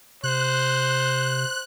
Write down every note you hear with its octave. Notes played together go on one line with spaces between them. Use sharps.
C3 C5 F#6